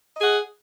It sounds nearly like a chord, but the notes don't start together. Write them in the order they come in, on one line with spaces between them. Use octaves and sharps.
D#5 G#4 F#5